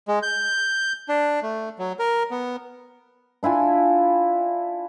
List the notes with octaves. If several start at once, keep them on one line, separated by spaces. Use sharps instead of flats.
G#3
G6
D4
A3
F#3
A#4
B3
D4 E4 F4 G#5